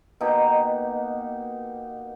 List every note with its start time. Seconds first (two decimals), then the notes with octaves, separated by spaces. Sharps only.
0.21 B2 A#3 D#4 G4